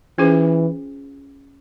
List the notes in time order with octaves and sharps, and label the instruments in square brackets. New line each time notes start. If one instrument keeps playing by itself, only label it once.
[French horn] E3 [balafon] C#4 F4 G#4 C5